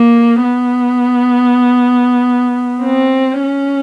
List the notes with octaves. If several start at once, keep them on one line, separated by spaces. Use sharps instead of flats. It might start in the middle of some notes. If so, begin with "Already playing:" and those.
Already playing: A#3
B3
C4
C#4